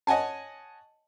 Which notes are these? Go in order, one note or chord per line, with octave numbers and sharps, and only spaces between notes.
C#5 D#5 F#5 G#5 A5